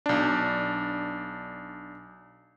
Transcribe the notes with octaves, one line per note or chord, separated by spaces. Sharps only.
B1 D4